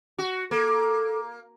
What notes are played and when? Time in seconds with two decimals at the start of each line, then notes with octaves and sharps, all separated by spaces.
0.18 F#4
0.51 A#3 A4